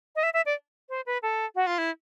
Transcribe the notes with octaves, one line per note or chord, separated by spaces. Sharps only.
D#5
E5
E5
D5
C5
B4
A4
F#4
F4
E4